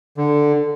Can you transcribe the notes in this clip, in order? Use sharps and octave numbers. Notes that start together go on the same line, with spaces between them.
D3